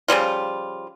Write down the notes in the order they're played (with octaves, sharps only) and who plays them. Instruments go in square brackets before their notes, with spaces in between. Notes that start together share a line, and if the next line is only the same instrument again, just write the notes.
[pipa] C#3 F3 G3 F4